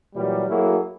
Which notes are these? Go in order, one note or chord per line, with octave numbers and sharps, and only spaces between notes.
A#2 E3 F#3 G3
F#3 A3 A#3 E4 F#4 G#4